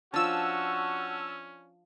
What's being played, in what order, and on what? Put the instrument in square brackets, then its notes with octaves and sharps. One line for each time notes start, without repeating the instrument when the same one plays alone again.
[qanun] F3 D4 [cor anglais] C#4 [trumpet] F#4 [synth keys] A5 E6